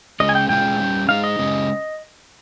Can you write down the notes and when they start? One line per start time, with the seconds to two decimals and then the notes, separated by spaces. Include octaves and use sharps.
0.20 C#3 G#3 C#4 G#4 D#5
0.29 G#5
0.35 G5
0.49 A#2 G#3 C#4 F4 G#4 G5
0.80 G3 C#4 G4
1.09 G#3 D#4 G#4 F5
1.24 D#5
1.39 C#3 G#3 C#4 G4